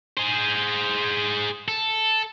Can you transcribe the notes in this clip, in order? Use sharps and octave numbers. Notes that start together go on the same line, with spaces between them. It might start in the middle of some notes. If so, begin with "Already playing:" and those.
G#4 C5
A4